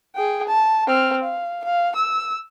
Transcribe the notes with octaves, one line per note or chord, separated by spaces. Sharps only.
G#4 G5
A5
C4 F6
F5
F5
E6